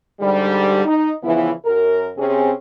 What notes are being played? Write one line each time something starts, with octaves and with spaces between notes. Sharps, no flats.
G#2 D3 G3
D#4
C#3 E3 F3 B3 E4
F#2 A#4
C3 C4 C#4 G#4